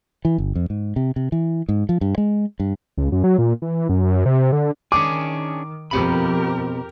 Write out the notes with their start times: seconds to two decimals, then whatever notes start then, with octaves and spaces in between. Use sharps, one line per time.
0.25 E3
0.38 G1
0.55 F2
0.70 G#2
0.96 C3
1.16 C3
1.32 E3
1.69 G#2
1.89 F3
2.01 G2
2.18 G#3
2.60 G2
2.97 C#2
3.12 F#2
3.24 F#3
3.38 A#2
3.62 E3
3.89 F#2
4.26 C3
4.52 D3
4.92 D#3 C#4 D4 G#4 D6
5.91 F2 B2 C4 G4 A#4 B5